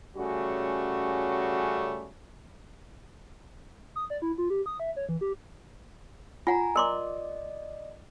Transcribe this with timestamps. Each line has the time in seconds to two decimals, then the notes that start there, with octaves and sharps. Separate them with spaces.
0.17 C#3 G3 A3 C#4 F#4
3.96 D#6
4.10 D5
4.22 E4
4.38 F4
4.50 G4
4.66 D#6
4.80 E5
4.96 C#5
5.09 E3
5.21 G4
6.47 F4 F#5 G#5 A#5
6.76 A#4 D5 D#5 C6 D6